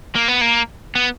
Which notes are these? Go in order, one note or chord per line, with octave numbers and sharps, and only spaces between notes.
A#3
B3
A#3
B3